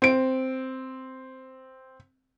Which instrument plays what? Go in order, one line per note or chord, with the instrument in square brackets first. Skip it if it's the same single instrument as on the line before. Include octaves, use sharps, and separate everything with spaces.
[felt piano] C4 D7